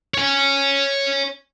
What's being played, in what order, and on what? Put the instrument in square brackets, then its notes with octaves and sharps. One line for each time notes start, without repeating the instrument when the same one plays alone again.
[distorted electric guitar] C#5 G#5